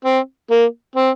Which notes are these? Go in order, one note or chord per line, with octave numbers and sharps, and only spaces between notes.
C4
A#3
C4